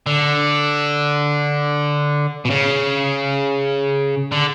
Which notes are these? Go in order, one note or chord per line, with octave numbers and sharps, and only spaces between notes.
D3
B2
C#3
D3